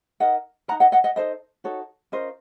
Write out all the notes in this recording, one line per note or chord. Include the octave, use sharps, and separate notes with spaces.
D#4 A#4 D#5 F#5
A#4 F#5 A#5
D#4
D#5 F#5
D#5 F#5
D#5 F#5
D#4 F#4 A4 C5 D#5
D#4 F#4 A4 C#5
C#4 F4 A#4 C5 D#5